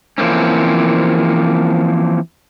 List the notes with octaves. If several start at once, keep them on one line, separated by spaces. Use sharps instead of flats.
E3 F3 A#3 C4 C#4